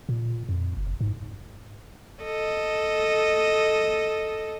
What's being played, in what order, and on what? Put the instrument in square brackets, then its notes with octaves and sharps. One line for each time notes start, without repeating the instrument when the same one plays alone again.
[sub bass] A#2
F2
F#1
G#2
[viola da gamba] A4 D#5